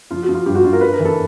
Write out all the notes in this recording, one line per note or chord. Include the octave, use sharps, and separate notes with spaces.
F3 F4
F#4
F3
F4
G2 G4
F#4
G2 F4
A#4
G3 B4
A#4
E3
A4